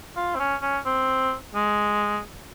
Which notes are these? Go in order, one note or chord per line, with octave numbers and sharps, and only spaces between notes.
F4
C4
C#4
C#4
C4
G#3